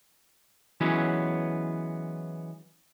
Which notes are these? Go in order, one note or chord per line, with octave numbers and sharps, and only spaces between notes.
E3 F#3 G#3 B3 C#4